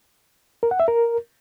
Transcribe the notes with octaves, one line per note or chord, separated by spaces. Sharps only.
A#4
F#5
E5
A#4